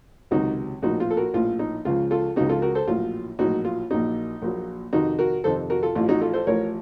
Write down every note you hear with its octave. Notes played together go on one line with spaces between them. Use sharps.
C#2 C3 D#3 F#3 D#4 F#4
A#1 A2 F3 D#4 F#4
F4
A4
F#4 A#4
A#1 A2 F3 F4
D#4
C#2 C#3 F3 F4
F4 A4
C#2 C#3 F3 D#4 F#4
F4 A4
F#4 A#4
A4 C5
A#1 A2 F#3 F4
A#1 A2 F#3 D#4 F#4
F4
A#1 A#2 F#3 D#4
A#1 A#2 F#3
F2 C3 D#3 D#4 F#4
F#4 A#4
F2 C3 D#3 A4 C5
F#4 A#4
F4 A4
A1 A2 F3 F4
D#4 F#4
F4 A4
A4 C5
A1 A2 F3 A#4 C#5